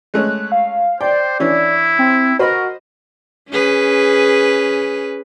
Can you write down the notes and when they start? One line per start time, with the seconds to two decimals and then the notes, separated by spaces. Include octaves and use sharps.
0.14 G#3 A3 C#4 F#6
0.52 F5
1.01 C5 D5 G5
1.40 E3 C#4 D4 E4
1.99 C4
2.39 F#4 A#4 C5 D#5 B5
3.50 C#4 G#4 B4